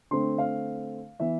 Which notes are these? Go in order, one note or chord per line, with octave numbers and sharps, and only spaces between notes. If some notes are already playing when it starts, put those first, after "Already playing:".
D3 A3 C4 C6
F5
E3 B3 E5